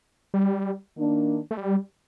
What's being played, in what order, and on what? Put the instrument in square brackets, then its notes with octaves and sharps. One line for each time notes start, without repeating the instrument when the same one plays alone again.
[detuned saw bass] G3
[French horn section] D#3 A#3 D4
[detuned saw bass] A3
G3